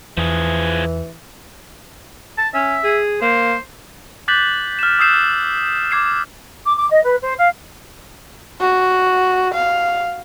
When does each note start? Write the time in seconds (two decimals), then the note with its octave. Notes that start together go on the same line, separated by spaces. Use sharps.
0.17 E2 E3 F3 G#4
2.38 A5
2.54 C#4 E5
2.83 G#4
3.21 A#3 C5
4.28 D6 F#6 G6 A6 B6 F#7
4.79 F6 E7
4.99 D#6 E6 G6 C7 E7
5.91 D6 G#6 C7 E7
6.65 D6
6.77 D6
6.90 D#5
7.04 B4
7.22 C5
7.38 F5
8.60 F#4
9.54 F5